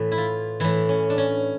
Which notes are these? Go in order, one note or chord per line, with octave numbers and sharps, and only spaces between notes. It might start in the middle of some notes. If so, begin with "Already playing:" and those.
Already playing: A2 E3
E4
F4
A2 E3 E4
C#4
D4
C#4